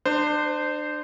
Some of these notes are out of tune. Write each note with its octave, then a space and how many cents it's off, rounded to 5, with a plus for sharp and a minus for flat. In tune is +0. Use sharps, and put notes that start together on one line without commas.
D4 +30 C5 -15